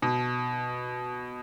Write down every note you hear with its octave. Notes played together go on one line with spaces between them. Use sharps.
B2